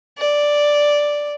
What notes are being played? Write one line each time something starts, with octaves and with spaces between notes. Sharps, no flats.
D5